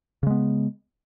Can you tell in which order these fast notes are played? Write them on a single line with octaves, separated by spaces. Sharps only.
C#3 G#3 B3